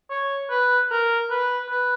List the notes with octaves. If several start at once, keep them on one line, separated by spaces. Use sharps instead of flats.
C#5
B4
A#4
B4
B4